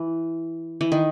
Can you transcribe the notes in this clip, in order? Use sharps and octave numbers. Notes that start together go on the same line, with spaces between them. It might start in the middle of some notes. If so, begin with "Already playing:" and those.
Already playing: E3
E3
D#3